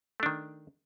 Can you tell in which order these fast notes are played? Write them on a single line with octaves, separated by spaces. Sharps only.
A3 D4 D#3